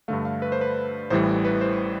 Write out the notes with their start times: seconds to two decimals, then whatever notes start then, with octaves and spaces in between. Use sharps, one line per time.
0.08 G2 D3 A3 F5
0.25 F5
0.42 B4
0.52 C5
0.61 B4
1.10 A1 A2 E3 G3 C5
1.45 B4
1.61 C5